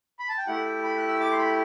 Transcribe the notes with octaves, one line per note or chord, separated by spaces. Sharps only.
B5
A5
G5
A3 E4 G4 F#5
G5
B5
F#6
E6
D6
C6
B5